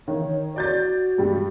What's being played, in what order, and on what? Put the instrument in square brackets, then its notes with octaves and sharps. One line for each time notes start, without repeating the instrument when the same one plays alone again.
[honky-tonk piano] D#3 [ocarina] C#5
[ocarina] F#4 [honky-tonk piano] D5 G6 A6
[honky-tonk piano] G2 G3 G#3